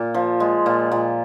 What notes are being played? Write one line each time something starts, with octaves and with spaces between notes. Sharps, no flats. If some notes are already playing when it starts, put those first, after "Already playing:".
Already playing: A#2
F3
G#3
A#2
A#2